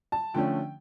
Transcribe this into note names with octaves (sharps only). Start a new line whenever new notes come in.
A5
D3 F3 A3 C#4 G5